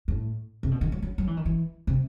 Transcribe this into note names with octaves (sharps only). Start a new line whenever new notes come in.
A2
C3
B2
D#3
F#3
F#3
F#3
E3
D#3
E3
C3